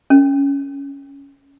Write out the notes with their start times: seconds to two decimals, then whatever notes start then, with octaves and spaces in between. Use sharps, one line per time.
0.10 C#4